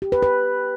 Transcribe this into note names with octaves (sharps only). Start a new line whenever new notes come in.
G4
B4
B4